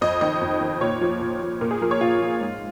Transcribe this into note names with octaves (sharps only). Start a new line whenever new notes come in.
F2 D#5
D#3 D#5
F2
D#3
A#2 C#5
F3
A#2
F3
A#2 A#4
G#4
F3 A#4
C#5
A#2 F4
F3
G#2